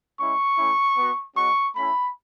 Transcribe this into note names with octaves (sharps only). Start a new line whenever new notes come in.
G#3 C#4 E4 C#6
A3 C#4 E4
B3 F#4
G#3 C#4 F#4 C#6
A3 C#4 E4 B5